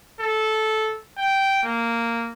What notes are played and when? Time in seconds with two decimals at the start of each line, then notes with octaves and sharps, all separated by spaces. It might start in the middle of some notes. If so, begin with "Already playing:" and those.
0.21 A4
1.19 G5
1.64 A#3